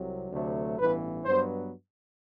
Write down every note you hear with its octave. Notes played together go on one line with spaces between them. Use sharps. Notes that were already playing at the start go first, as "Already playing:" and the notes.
Already playing: C2 C3 F#3
D2 C3 F#3 A3
A1 G2 E3 B3 B4
G2 F#3 B3 C5